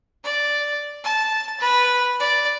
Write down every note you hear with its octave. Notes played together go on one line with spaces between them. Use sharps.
D5
A5
B4
D5